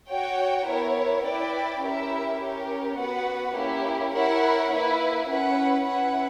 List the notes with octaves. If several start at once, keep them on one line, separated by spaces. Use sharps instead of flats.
F#4 C#5 G5
B3 E4 A#4 C#5
E4 B4 D5 G5
C#4 E4 G4 A#4 E5
C#4 G4 A#4 C#5
B3 F#4 B4 F#5
A#3 C#4 E4 G4
E4 A#4 C#5 F#5
A#3 E4 B4
C#4 E4 B4 F#5
C#4 E4 B4 F#5